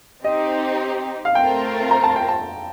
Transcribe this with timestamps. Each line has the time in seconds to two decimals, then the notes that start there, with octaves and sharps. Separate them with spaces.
0.24 C4 D#4 G4 D#5
1.25 F5
1.35 A3 C4 F4 A#4 G5
1.91 A#5
2.04 A5
2.16 G5
2.28 A5